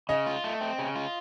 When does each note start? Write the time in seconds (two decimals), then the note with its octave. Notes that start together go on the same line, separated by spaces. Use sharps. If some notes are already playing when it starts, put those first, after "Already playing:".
0.09 C#3 D#5
0.26 F4
0.44 A3
0.61 C4
0.78 C#3
0.95 F4